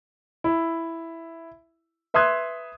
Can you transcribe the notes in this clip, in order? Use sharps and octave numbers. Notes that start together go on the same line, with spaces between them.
E4
B4 E5 C6 D#6 F#6 G#6